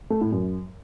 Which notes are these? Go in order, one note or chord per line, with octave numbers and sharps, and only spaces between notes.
A3
A2
F#2